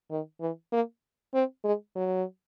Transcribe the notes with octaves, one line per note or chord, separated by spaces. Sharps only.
D#3
E3
A#3
C4
G#3
F#3